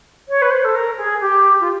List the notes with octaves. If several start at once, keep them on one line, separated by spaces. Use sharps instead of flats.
C#5
B4
C5
A4
A#4
G#4
G4
F4